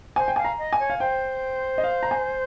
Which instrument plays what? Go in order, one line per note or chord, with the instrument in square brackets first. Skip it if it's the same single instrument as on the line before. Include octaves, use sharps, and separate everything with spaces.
[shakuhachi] C5 [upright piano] G#5
[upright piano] G5
[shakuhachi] F5 [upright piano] G#5
[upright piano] A#5
[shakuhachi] D#5
[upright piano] G#5
[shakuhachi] C#5
[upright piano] F5
[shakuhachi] C5 [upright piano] G5
[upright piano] D#5
F5
A#5
G#5